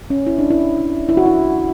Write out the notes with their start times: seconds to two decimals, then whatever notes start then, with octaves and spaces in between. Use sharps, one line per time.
0.10 C#4
0.26 E4
0.38 D4
0.51 E4
1.09 E4
1.17 F#4
1.26 E4